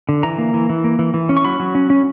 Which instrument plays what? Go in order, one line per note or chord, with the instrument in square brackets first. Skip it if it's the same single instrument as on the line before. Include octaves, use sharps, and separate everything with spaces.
[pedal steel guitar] D3
E3 A#5
A#3
E3
E3
A#3
E3
E3
C#4
C#6
F#3 B5
F#3
C#4
C#4